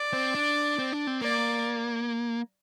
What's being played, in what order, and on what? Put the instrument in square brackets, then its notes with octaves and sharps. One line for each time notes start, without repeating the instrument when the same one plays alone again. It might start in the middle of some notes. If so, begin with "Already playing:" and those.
Already playing: [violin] D5
[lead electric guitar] C4
D4
C4
D4
C4
[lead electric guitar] A#3 [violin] D5